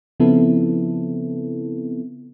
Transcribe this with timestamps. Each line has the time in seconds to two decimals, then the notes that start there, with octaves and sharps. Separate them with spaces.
0.20 C#3 F3 B3 C4 E4 A4